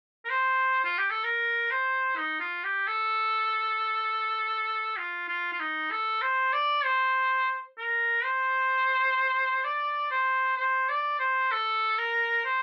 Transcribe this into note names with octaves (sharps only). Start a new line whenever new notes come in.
A#4
C5
F4
G4
A4
A#4
C5
D#4
F4
G4
A4
F4
F4
F4
D#4
A4
C5
D5
C5
A#4
C5
D5
C5
C5
D5
C5
A4
A#4
C5